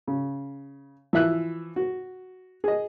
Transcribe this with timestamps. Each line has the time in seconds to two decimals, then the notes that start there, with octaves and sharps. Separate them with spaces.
0.08 C#3
1.13 E3 F3 E5 F#6
1.76 F#4
2.64 G#4 D#5